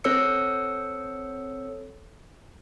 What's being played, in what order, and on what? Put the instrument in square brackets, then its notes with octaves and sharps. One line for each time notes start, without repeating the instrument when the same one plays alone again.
[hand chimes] C4 A4 C#5 E6 C#7